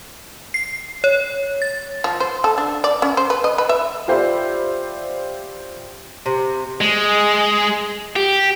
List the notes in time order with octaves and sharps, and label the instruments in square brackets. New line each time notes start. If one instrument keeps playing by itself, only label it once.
[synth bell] C7
C#5
A6
[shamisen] F3
C5
A4
D4
D5
C#4
C5
B4
D#5
B4
E5
[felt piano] F4 G4 C5 D5 E5 B5
[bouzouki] C3
[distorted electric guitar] G#3
G4